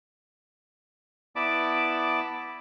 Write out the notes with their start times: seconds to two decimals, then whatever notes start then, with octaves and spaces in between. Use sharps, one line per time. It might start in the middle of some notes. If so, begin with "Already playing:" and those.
1.36 B3 E4 D5 A5 B5 D6